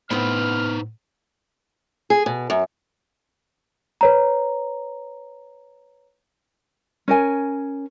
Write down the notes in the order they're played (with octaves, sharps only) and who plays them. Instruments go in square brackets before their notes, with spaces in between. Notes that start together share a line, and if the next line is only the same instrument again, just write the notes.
[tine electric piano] A2 [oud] B3 C4 [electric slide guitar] D#4 B4 C5 [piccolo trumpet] F6
[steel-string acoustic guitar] G#4
B2
F#2
[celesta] B4 C#5 A#5
[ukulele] C#4 A#4 G#5